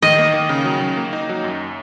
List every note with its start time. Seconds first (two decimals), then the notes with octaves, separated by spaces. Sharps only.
0.02 D#3 D#5
0.18 A#3
0.34 D#3
0.49 C#3
0.65 F#3
0.81 C#3
0.97 A#3
1.13 D#4
1.29 F#3
1.44 F#2